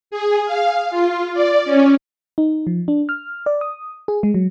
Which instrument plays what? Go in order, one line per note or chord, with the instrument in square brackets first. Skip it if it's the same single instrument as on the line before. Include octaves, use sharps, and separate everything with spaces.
[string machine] G#4
F5
F4
D5
C#4
[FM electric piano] D#4
F3
D4
F6
D5
D#6
G#4
G#3
F#3